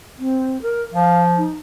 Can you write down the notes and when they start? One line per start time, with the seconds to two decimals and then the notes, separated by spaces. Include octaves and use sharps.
0.19 C4
0.62 A#4
0.94 F3 F5
1.37 D#4